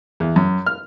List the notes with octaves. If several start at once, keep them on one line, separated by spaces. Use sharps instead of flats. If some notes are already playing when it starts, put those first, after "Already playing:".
E2
F#2
F6